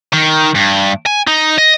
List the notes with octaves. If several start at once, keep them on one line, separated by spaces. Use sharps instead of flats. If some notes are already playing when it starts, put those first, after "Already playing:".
D#3
G2
G#5
D#4
D#5